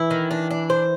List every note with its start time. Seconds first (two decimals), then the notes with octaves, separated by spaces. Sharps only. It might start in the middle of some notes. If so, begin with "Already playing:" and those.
Already playing: E3 E4
0.11 D#3
0.31 D4
0.51 D4
0.70 C5